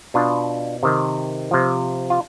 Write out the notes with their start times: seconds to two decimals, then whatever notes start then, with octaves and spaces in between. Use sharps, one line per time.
0.14 B2 D4 F4
0.83 C3 D#3
1.51 C3 F3
2.10 F4